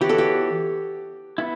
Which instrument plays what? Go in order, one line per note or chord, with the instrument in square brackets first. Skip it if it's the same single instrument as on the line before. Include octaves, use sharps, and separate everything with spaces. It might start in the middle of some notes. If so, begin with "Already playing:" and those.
[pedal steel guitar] E3 B3 F#4 C#5 [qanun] G4
[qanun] A4
G4
[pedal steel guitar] B3 E4